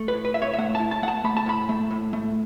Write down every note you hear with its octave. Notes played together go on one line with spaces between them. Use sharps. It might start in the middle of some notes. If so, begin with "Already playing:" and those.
Already playing: A3
B4
A2
B4
A2 E5
C#5
E5
A3 F#5
A5
E4
A5
A3 F#5
A5
A3 B5
A5
A2 B5
A3
A2
A3